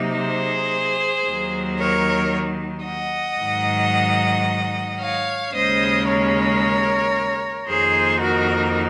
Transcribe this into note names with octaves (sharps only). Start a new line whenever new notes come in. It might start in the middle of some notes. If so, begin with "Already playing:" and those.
Already playing: C3 F#3 A#3 D#4
G#4 C5
D#2 D#3 F#3
A#4 C#5
D#5 F#5
G#2 D#3 F#3
C#5 F5
D#2 C#3 G#3 C#4 C5 D#5
A#4 C#5
F2 D#3 A#3 D#4 G#4 C5
F#4 A#4